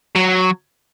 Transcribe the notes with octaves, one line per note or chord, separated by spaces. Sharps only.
F#3